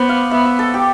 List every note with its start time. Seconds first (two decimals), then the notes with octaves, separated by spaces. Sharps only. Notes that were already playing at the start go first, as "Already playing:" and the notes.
Already playing: B3 C5 D5
0.09 F5
0.31 B3 E5
0.45 E5
0.59 A4
0.74 G4